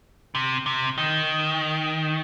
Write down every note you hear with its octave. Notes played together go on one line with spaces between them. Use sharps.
C3
C3
D#3